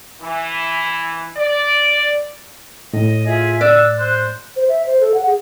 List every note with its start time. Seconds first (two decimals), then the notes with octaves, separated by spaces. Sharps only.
0.21 E3
1.36 D5
2.93 A2 D#5
3.26 F4 G#4 E5
3.61 D5 E6 F#6
3.99 C5
4.56 C5
4.69 E5
4.86 C5
5.01 A4
5.14 F#5
5.26 G#4